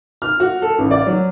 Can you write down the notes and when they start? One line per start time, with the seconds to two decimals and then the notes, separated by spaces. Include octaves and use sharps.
0.22 F6
0.40 F#4
0.62 A4
0.79 A1
0.91 D5
1.07 F#3